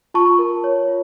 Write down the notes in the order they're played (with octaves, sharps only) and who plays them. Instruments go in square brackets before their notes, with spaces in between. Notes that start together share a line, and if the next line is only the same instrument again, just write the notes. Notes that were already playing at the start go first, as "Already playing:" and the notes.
[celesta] F4 A5 C#6
A#4
C#5
F4